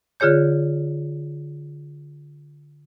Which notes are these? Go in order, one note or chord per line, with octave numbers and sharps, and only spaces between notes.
D3 F4 G#4 C#5 G6